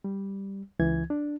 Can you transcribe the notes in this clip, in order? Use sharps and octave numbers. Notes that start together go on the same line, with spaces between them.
G3
C#2 E3 G#6
D4